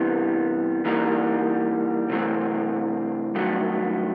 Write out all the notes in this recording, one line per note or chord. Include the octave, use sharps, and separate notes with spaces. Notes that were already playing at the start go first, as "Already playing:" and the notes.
Already playing: C3 E3 G3 B3
E3 G3 A#3 D#4
C3 E3 A3 C4
G2 D#3 F#3 A3